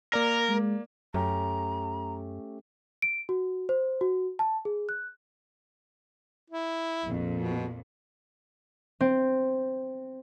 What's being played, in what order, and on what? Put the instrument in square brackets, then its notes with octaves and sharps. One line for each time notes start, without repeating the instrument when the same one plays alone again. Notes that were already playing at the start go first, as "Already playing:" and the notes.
[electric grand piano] A#3 D5 [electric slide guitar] A#4
[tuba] G#3
[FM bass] F#2 [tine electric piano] A3 C#4 G4 [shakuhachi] A#5
[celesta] D7
F#4
C5
F#4
A5
G#4
F#6
[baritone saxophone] E4
[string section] A#1 F2
[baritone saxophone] B2
[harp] C4